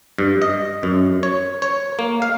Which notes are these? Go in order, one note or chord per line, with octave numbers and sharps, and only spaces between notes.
G2
D#5
F#2
C#5
C#5
A#3
F5